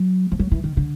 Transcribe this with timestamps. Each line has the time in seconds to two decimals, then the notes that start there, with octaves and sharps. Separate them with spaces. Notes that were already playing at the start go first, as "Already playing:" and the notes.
Already playing: F#3
0.32 F3
0.39 F#3
0.52 E3
0.64 D#3
0.77 D3